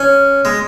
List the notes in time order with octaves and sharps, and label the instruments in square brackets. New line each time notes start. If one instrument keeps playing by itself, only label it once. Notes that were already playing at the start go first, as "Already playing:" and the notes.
Already playing: [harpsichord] C#4
G#3